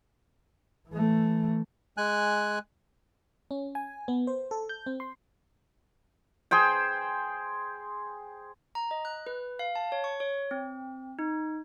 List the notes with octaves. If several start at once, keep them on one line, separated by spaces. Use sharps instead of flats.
E3 A3
G#3 G#5 F#6
C#4
G#5
B3
C5
A4
G6
C4
C6
G#4 C5 G5
A#5
D#5
F#6
B4
F5
A5
C#5
C#6
C#5
C4
D#4